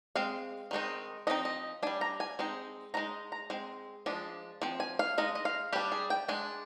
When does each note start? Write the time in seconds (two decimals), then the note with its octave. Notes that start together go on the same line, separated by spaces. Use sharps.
0.15 G#3 C4 F5
0.71 D#3 G#3 C4 D#4
1.27 F3 C4 D#4 D#5
1.45 D#5
1.83 G3 D4 G#5
2.01 A#5
2.20 G#5
2.39 G#3 C4 D#4
2.94 D#3 G#3 D#4 A#5
3.32 A#5
3.50 G#3 C4
4.06 F3 G#3 D4
4.62 F3 C4
4.80 G#5
4.99 F5
5.18 G#3 D#4 D#5
5.35 D#5
5.45 F5
5.73 G3 D4 G4
5.92 G#4
6.10 G5
6.28 G#3 D4 G#5